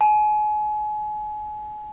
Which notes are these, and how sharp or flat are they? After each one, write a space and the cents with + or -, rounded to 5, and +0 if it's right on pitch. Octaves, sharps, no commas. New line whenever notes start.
G#5 +35